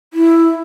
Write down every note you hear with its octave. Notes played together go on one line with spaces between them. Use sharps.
E4